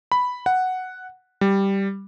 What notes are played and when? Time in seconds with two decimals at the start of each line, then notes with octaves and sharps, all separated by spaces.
0.12 B5
0.46 F#5
1.41 G3